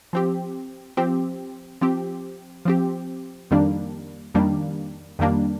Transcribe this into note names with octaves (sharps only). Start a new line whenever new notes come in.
F3 C4 G4
F3 C4 G4
F3 C4 G4
F3 C4 G4
F2 D#3 G3 A#3 D4
F2 D#3 G3 A#3 D4
F2 D#3 G3 A#3 D4